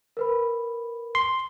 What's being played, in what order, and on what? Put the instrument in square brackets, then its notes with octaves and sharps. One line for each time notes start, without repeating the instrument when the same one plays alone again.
[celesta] A#4 B4 B5
[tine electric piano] C6